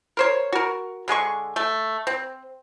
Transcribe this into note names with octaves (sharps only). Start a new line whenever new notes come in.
A#4 C5 C#5
F#4 A#4
D3 G#3 G#4 C#6
A3
C4